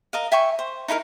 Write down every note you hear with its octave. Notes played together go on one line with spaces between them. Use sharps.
A#4 D#5 F5
E5 G5 G#5 C#6
C5
D#4 E4 A4 A#4